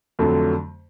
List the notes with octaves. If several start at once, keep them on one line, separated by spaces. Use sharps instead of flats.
F2 D3 F#3 A3